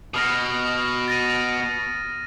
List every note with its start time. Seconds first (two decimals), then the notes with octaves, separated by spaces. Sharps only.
0.14 B2 D#6 F6 A#6
1.08 A6 A#6 D#7